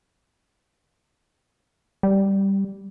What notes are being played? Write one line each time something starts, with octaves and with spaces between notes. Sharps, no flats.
G3